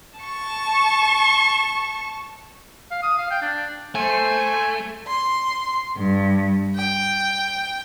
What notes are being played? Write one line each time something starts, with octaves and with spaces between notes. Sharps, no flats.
A5 C#6
F5
D#6
F5
G5
D4
A3 C5 G#5
C6
G2
G5